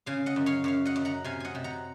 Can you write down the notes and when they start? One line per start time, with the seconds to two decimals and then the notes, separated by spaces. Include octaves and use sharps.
0.06 C#3 F5 G#5
0.26 D#5 F#5
0.36 F#2
0.46 C#5 F5
0.64 F#2 C#5 F5
0.85 D#5 F#5
0.96 F#2
1.05 F#5 A#5
1.24 C3 F5 G#5
1.40 D#5 F#5 G#5
1.55 C3
1.64 F#5 A#5